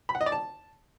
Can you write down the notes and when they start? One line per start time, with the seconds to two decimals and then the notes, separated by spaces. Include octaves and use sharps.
0.09 B5
0.15 F#5
0.21 D#5
0.26 D5
0.32 A5